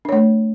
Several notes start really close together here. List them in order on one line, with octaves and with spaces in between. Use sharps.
D4 C#5 A3